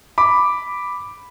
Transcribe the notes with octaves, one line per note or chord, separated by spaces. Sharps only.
B5 D6